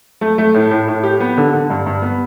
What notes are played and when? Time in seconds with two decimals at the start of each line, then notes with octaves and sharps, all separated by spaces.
0.21 A3
0.38 A3
0.54 A2
0.71 A2
0.88 A2
1.03 G4
1.20 B3
1.37 D3
1.53 D3
1.70 G2
1.86 G2
2.02 B3